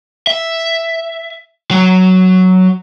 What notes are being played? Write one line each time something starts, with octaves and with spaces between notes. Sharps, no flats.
E5
F#3